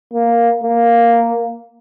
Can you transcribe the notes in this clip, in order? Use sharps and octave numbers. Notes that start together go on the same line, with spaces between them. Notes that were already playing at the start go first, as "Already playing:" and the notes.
A#3
A#3